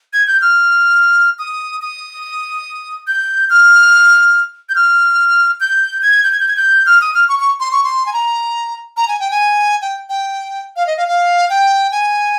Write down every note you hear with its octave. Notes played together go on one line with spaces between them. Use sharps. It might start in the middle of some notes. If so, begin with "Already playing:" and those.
G#6
G6
F6
D#6
D#6
G6
F6
G6
F6
G6
G#6
G6
G#6
G6
G#6
G6
F6
D#6
F6
C#6
C#6
C6
C#6
C6
G#5
A#5
A#5
G#5
G5
G#5
G5
G5
F5
D#5
F5
F5
G5
G#5